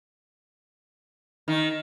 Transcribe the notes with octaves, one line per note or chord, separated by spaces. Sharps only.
D#3